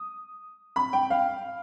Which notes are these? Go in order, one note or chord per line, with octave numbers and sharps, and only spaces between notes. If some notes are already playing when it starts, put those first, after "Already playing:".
Already playing: D#6
B5
G5
F5